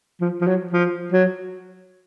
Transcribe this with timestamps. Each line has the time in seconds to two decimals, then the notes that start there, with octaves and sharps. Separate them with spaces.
0.20 F3
0.41 F3
0.47 F#3
0.73 F3
1.12 F#3